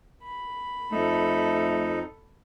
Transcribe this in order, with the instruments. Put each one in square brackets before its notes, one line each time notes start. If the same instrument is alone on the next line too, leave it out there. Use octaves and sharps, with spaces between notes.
[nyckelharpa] B5
[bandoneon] F2 D#4 [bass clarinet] A3 [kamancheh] A4